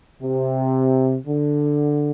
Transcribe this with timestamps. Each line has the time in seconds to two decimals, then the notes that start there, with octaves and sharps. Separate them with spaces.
0.22 C3
1.27 D3